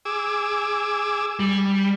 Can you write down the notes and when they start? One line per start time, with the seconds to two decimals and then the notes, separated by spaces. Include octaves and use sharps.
0.05 G#4 D6 E6
1.40 G3